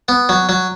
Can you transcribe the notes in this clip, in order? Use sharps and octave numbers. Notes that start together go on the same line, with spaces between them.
B3
F#3
F#3